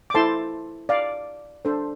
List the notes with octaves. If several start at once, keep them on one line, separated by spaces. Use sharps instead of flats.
D6
E4 A4 C5 A5 C6
D5 F5
D4 A4 C5